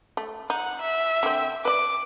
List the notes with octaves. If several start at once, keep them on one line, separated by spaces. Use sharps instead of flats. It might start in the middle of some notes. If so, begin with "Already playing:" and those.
A3
D#4 F#5
E5
D3 C4
B4 D5 D6